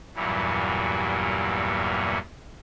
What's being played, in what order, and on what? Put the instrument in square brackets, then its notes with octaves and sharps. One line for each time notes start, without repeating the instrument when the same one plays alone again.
[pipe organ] E2 G2 A#2 E3 F#3 G3